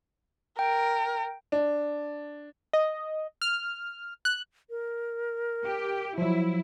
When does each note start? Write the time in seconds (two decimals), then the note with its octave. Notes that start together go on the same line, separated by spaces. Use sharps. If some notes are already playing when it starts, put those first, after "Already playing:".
0.59 A#4 G5
1.52 D4
2.73 D#5
3.42 F6
4.25 F#6
4.70 A#4
5.65 G4
6.18 F3 F#3 E4